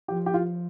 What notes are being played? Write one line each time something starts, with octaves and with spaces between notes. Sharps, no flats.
F3 G4
G4
F4